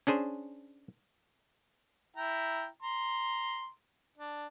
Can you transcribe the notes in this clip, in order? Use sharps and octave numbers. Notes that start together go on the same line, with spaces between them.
C#4 D4 G#4 C5
E4 G5 A#5
A#5 C6
D4